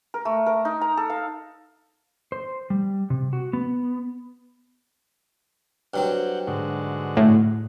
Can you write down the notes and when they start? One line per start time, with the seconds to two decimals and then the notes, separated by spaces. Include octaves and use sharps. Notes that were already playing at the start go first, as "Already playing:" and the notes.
0.14 A#4
0.25 A3
0.46 A#4
0.65 D#4
0.81 A#5
0.97 A4
1.10 F5
2.32 C5
2.70 G3
3.10 C3
3.33 F#4
3.53 B3
5.94 G2 F#3 C4 F#5 G5
6.47 G#2 D3 F#4
7.17 A2